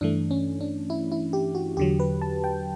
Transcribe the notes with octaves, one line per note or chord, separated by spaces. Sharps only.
G2 E3 A3 D4
C#4
D4
E4
E4
G4
F#4
E2 D3 F#3 G4
B4
A5
G5